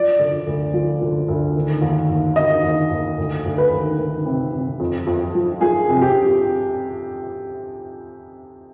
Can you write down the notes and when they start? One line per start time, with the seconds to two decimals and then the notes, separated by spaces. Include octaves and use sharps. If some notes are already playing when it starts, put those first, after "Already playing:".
Already playing: F3 D5
0.19 D3
0.47 D2
0.73 F3
1.01 D3
1.28 D2
1.55 D#3
1.82 D#2
2.09 D#2
2.36 D#3 D#5
2.64 D#2
2.90 D#2
3.18 D2
3.45 D2
3.58 B4
3.71 D#3
3.99 D#3
4.26 C3
4.53 C3
4.80 F2
5.07 F2
5.35 F3
5.61 F3 G#4
5.89 C3
6.01 G4